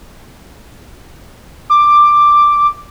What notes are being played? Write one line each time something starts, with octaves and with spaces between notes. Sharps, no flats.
D6